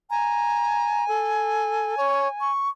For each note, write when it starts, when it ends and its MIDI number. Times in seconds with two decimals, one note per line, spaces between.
0.10 2.52 80
0.10 1.07 82
1.08 1.95 69
1.97 2.28 73
2.41 2.69 85